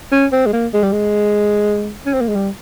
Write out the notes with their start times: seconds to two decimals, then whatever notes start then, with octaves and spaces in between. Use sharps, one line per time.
0.12 C#4
0.33 C4
0.46 G#3
0.53 A#3
0.74 G#3
0.83 G3
0.92 G#3
2.06 C#4
2.14 C4
2.21 A#3
2.28 G#3
2.35 G3